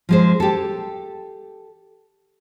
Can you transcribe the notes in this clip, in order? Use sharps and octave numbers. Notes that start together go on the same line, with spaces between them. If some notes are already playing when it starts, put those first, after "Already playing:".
F3 G#3 C5
G4 A4